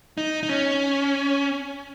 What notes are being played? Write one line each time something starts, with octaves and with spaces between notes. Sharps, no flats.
D#4
D#4
C#4